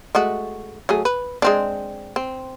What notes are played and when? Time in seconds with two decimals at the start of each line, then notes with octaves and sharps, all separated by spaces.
0.15 G#3 A3 F#4
0.89 F#3 A3 G#4
1.05 B4
1.42 G#3 C4 D4
2.16 C4